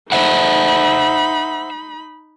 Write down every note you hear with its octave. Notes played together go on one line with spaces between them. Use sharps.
D#4 C5 E5 F#5 B5